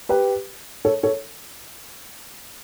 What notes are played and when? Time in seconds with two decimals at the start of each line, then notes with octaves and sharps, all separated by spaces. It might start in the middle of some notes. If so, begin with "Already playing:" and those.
0.09 G4 B4
0.85 A4 C#5
1.03 A4 C#5